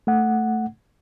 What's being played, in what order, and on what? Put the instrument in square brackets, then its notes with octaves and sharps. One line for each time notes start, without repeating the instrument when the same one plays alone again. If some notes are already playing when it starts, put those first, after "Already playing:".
[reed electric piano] A3 F#5